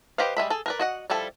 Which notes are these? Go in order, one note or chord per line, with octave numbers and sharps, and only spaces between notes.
G4 B4 C5 D#5 F5
G3 G#3 E5 B5
G#4 A4
A#4 B4 D5
F#4 D#5 F#5
F3 G3 E4 A4